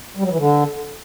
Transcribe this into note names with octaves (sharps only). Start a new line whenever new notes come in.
G3
F#3
E3
D3